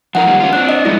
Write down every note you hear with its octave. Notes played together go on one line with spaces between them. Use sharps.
F3 D#4 A#4 F#5
D#3 G3 A#3
C#4 F4
C4 D4 F#6
D#5
G2 F3 G#3 E4